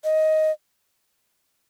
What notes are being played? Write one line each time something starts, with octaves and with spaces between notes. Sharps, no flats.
D#5